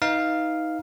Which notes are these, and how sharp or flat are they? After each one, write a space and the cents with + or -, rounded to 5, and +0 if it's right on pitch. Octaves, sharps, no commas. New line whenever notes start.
D#4 +20 B4 +15 F5 +0